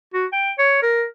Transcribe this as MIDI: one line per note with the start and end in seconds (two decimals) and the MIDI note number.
0.14 0.26 66
0.33 0.51 79
0.59 0.81 73
0.82 1.04 70